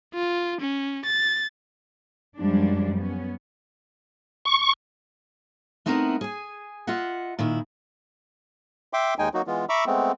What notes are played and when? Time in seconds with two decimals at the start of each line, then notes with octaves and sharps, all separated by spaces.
0.14 F4
0.60 C#4
1.05 A6
2.38 F#2 F3 G3 G#3 D4
2.96 B3 C#4
4.45 C#6
5.86 A3 B3 C4 D#4 E4 A#4
6.21 G#4 G#5
6.87 F4 D#5 E5 F#5
7.39 A#2 D#3 E4
8.93 E5 G5 C6 D6
9.19 D#2 G#3 D#4 G5 G#5
9.34 F#3 A#3 D#4 F#4
9.47 E3 G#3 B3 F4
9.69 E5 A#5 B5 C#6 D6 E6
9.87 G#3 A3 B3 C4